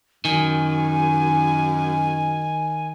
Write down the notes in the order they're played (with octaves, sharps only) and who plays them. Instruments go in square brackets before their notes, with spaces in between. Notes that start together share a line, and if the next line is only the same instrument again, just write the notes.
[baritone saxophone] F#2 [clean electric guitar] D#3 [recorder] G#5